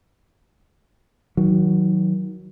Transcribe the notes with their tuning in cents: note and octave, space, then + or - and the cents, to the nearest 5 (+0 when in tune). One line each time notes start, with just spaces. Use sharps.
D#3 +30 F#3 +0